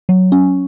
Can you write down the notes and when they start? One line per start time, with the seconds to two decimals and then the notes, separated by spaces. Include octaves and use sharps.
0.09 F#3
0.32 C#4